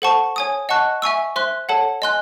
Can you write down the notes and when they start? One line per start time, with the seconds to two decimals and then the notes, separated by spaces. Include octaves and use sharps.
0.02 A4 C5 F#5 A5 C#6
0.36 C#5 G#5 D#6
0.69 D#5 F#5 A5 C#6 F#6
1.02 E5 G#5 C#6 E6
1.36 C5 E5 C6 F#6
1.69 A4 C#5 F#5 A5
2.02 D#5 G#5 C6 F#6